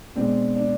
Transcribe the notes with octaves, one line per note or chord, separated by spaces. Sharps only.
B2 G#3 C4 D4
D4